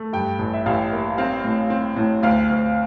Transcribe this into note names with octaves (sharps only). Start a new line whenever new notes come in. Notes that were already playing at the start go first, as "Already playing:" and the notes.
Already playing: A3
G2 G5
A1
E5
A1 F5
A#3
C4 F5
A2
C4
A2
D2 F5
D2